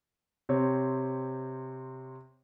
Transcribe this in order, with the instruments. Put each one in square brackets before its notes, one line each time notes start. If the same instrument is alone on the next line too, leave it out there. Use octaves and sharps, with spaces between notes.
[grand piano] C3 C4 C#5